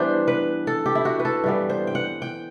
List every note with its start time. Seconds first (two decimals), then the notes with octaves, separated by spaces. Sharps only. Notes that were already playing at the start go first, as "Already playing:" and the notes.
Already playing: E3 G3 B3 D4 C5
0.28 B4
0.67 A4
0.86 G4
0.95 E4
1.05 F#4
1.19 B4
1.25 A4
1.44 G2 E3 G3 B3
1.70 C5
1.87 G5
1.95 F#5
2.22 G5